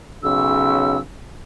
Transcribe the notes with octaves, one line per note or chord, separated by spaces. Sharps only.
B1 C#3 E6